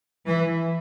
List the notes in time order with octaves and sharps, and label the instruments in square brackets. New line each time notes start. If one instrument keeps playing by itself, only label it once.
[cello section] E3